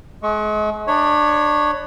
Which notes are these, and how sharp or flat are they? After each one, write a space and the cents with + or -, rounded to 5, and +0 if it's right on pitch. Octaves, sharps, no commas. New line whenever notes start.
G#3 +40 C#6 +0
D4 +25 C#5 +0 B5 +20